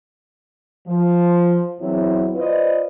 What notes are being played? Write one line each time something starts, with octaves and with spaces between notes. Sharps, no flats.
F3
E2 F#3 C4 E4
F4 B4 C5 D5 D#5